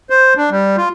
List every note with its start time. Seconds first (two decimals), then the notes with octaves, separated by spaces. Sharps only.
0.10 C5
0.37 D4
0.50 G3
0.77 F4